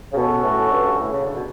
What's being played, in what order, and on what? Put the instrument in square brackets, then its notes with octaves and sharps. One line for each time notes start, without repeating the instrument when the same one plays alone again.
[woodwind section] C#3
[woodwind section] B2 [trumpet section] C#4 F#4 A4
[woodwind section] A2
G2
G2
A2
C#3
D3
B2